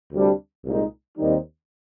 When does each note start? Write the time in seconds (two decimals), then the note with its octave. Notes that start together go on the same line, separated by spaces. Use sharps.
0.12 D2 C3 G3 D4
0.65 C2 A#2 G#3 D#4
1.17 D#2 D#3 G3 C4 D#4